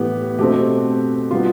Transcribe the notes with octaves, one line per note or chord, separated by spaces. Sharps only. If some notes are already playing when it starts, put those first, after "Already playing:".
Already playing: A2 E3 B3 G4
B2 A3 C4 G4
B2 G3 B3 F4